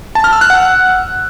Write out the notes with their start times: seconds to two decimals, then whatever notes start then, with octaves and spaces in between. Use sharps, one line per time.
0.15 A5
0.24 F6
0.33 E6
0.41 F#6
0.50 F#5